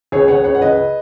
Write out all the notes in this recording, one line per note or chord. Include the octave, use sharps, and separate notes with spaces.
C#2 G#4 C#5
C#2 C#5 F#5
C#2 C#5 F#5
F#5
C#2 B4 D#5